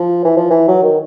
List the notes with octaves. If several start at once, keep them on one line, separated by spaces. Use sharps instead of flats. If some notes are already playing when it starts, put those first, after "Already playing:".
Already playing: F3
E3
F3
E3
F#3
D#3